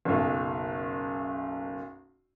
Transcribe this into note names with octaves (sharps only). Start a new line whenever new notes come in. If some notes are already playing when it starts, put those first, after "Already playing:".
F#1 B1